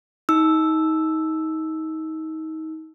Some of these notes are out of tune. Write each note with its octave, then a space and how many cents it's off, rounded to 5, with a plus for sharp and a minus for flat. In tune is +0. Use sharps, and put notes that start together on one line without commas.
D#4 +30 E6 +0